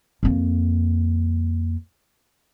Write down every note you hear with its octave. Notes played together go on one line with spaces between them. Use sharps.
F2 A#3